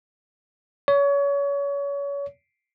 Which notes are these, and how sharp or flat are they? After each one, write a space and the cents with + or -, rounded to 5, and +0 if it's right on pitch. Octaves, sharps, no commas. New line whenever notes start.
C#5 +30